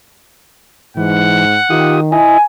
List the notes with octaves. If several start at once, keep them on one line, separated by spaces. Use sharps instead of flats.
G#2 E3 F#5
D#3 F4 G4 D#6
E4 D#5 G#5